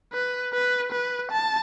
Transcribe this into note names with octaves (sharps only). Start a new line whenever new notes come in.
B4
B4
B4
A5